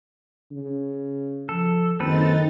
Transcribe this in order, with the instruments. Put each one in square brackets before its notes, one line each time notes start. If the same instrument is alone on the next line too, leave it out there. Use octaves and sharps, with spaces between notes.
[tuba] C#3
[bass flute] F3 [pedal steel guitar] A4
[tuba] F#1 [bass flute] D#3 [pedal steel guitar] C4 A4 B4 [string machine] D#4 A6